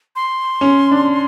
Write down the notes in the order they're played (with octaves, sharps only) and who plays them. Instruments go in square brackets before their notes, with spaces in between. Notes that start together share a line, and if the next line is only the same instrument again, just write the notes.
[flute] C6
[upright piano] C#4
D4